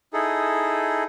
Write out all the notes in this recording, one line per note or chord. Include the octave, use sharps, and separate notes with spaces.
D#4 E4 G#4 A4